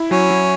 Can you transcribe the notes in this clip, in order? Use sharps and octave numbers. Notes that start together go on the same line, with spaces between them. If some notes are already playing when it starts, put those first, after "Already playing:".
Already playing: E4
F#3 C#4
F#3